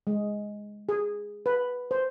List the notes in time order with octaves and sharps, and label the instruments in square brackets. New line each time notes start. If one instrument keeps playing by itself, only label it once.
[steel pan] G#3
G#4
B4
C5